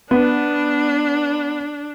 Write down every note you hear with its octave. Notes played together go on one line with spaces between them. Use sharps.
B3 D4